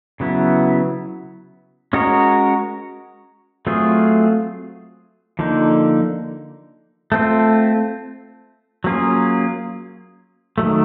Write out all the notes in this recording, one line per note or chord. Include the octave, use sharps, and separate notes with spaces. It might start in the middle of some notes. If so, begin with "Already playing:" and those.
C#3 F#3 B3 E4
G#3 C#4 F#4 A#4 C#5
F#3 A3 C4 F4 G#4
D3 F3 A#3 D#4
A3 C4 F4
F#3 A#3 C#4 F4 G#4
D#3 F#3 A3